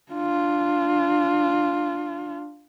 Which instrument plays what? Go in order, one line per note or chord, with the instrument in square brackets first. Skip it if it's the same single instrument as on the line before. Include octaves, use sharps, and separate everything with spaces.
[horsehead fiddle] D4 F4